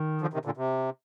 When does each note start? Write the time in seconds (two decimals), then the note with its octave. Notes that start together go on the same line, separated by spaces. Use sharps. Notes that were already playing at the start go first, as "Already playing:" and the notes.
Already playing: D#3
0.21 D3 F3
0.33 C3 D#3
0.45 A#2 D3
0.57 C3